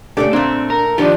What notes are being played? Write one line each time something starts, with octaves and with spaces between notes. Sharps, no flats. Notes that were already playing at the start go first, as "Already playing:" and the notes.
C#3 A3 D4 G4 A4 D5
A#2 A3 C4 D4
A#4
D#3 F3 D4 F4 G4